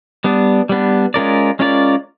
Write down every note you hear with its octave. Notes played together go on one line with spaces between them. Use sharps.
G3 B3 D4
G3 B3 D4
G#3 C#4 F4 A#4 D5
G#3 C#4 F4 A#4 D5